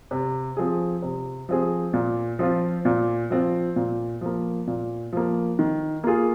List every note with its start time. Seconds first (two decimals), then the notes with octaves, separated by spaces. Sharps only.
0.11 C3
0.57 F3 C4 G#4
1.02 C3
1.49 F3 C4 G#4
1.93 A#2
2.39 F3 C4 F4
2.85 A#2
3.30 F3 C4 F4
3.76 A#2
4.21 F3 A#3
4.67 A#2
5.13 F3 A#3
5.59 D#3
6.04 A#3 F4 G#4